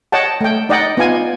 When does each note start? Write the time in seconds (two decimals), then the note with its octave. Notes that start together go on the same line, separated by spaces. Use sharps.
0.12 C#5 D#5 F#5 G5 A5
0.41 A3 G5
0.69 D#4 D5 D#5 F#5 G5
0.97 B3 D#4 F4 F5 G#5